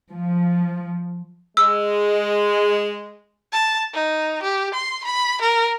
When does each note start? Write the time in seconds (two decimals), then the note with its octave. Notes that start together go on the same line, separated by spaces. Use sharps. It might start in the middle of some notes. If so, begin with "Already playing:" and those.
0.12 F3
1.57 G#3 E6
3.52 A5
3.94 D#4
4.43 G4
4.74 C6
5.04 B5
5.42 A#4